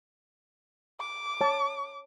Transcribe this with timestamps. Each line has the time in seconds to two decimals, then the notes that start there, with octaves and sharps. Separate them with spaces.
1.00 D6
1.41 C#5 A5